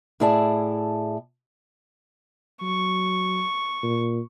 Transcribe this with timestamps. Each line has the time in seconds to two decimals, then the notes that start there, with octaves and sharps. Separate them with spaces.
0.20 A2 E4 G#4 D5 A5
2.62 F#3 C#6
3.83 A#2